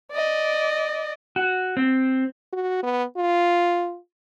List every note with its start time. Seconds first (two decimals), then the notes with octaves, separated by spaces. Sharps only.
0.12 D5 D#5
1.36 F#4
1.77 C4
2.53 F#4
2.83 B3
3.17 F4